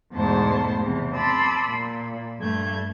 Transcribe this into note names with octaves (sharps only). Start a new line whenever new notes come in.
E2 G#2 B2 A3 C5 A5
E2 C3 E3
A5 B5 C6 D6 E6
A#2
G2 A3 G6 G#6